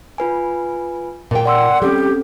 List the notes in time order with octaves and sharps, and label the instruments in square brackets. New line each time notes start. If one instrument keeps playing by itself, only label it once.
[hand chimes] F4 B4 G#5
[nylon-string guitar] A#2 G5
[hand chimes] D5 C6 E6 [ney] F#5
[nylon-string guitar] G3 [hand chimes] C4 C#4 A4 [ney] G4